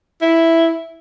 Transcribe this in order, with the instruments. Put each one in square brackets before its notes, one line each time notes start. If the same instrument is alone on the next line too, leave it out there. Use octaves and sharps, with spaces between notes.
[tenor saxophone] E4